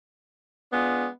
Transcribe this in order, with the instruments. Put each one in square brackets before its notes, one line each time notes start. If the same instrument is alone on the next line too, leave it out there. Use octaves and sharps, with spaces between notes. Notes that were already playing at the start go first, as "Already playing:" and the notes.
[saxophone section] G#3 D4 F4 [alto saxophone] B3